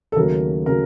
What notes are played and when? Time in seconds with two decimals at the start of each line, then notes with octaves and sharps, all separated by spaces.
0.12 A4
0.16 D#2 C#3 F#3 A3 A#4
0.66 C#3 F#3 A#4